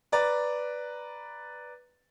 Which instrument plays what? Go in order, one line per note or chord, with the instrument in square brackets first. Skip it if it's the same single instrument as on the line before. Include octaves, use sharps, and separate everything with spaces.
[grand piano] B4 D5 A#5 A6